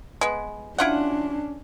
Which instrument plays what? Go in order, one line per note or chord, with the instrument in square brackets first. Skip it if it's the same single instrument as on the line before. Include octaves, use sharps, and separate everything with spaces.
[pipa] G#3 B3
[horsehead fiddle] C#4 D4 [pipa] E4 F4 F#5